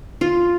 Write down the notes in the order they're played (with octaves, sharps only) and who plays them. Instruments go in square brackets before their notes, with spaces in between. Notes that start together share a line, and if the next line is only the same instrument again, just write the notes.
[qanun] F4